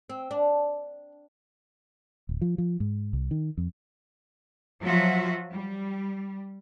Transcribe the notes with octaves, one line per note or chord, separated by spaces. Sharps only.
C4
D4
D1
F3
F3
G#2
C2
D#3
F2
F3 F#3 F4 F#4 E5
G3